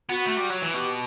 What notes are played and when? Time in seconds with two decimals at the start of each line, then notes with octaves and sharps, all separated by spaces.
0.09 B3 F#4
0.26 A3
0.37 G3
0.50 F#3
0.62 E3
0.74 B2 G4